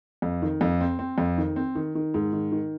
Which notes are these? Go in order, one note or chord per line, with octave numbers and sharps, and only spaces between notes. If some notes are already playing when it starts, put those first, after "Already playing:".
F2
D#3
F2
C4
C4
F2
D#3
C4
D#3
D#3
G#2
D#3
D#3